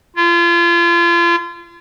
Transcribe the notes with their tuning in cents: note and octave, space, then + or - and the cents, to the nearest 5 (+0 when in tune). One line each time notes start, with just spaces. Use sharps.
F4 -35